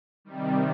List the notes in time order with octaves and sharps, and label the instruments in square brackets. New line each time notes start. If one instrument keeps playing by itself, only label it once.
[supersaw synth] C3 D#3 G3